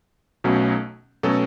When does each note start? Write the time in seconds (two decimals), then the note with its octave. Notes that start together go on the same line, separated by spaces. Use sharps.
0.44 B1 B2 F#3 A3 C#4
1.23 B2 F#3 A3 C#4 A4